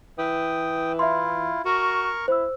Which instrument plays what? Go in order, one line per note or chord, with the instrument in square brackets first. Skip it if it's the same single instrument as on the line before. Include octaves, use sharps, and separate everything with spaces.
[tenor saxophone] E3 [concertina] G5 D#6
[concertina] E4 F4 [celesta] E5 C6
[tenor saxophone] F#4 [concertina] A#4 C#6
[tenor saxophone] E4 [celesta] C5 E6